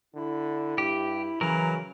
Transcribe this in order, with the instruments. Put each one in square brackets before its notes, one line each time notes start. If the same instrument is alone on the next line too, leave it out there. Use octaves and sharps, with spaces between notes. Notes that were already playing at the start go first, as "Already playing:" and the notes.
[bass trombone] D3 [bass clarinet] E4
[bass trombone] G2 [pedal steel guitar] G4
[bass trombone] C#3 [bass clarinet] E3 [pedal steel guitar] F#3 A#4